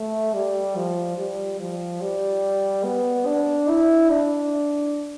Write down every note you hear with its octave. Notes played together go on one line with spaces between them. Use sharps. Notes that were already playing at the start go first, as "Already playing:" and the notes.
Already playing: A3
G3
F3
G3
F3
G3
B3
D4
E4
D4